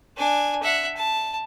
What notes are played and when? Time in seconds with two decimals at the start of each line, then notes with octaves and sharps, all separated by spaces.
0.17 D4 G#5
0.62 E5 F#5
0.96 A5